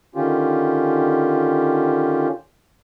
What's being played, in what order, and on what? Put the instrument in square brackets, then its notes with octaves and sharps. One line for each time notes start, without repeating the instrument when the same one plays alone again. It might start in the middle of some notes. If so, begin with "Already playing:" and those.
[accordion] D3 D#3 C#4 F4 G4